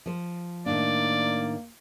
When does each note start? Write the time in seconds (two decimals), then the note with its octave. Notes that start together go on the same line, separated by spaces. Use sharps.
0.06 F3 C5
0.66 A2 D#3 A#3 D4 D5